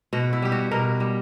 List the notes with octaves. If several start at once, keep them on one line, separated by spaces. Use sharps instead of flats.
B2 F#4
E4
G3 G4
F#4
B2 A#4
G3